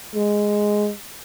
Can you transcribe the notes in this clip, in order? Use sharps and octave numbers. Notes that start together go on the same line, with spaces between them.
G#3